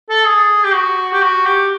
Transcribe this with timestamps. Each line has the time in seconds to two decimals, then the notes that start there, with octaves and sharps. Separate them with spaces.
0.10 A4
0.26 G#4
0.64 G4
0.75 F#4
1.13 G4
1.22 F#4
1.46 G4